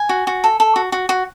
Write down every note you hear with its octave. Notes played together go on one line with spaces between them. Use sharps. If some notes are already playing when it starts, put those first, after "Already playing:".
Already playing: G#5
F#4
F#4
A4
A4
F#4
F#4
F#4